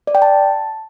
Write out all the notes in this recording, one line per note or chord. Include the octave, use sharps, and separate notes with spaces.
D5
G5
A5